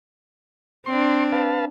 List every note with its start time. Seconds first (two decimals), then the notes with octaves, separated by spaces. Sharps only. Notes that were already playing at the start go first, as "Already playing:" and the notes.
0.86 C4 D4 C6
1.32 B4 F5 A5